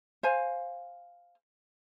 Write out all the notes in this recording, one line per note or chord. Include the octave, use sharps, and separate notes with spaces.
C5 F5 G#5